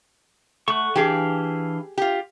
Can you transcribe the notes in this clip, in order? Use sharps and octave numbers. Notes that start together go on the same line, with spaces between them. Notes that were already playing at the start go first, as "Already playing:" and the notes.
A3 F#5 C#6
E3 D4 G4 G#4 F5
F4 G4